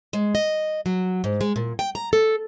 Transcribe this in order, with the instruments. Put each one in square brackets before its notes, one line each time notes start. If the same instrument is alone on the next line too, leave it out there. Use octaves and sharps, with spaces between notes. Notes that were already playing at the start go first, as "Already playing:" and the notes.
[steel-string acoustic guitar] G#3
D#5
F#3
G#2
G#3
A#2
G5
A#5
A4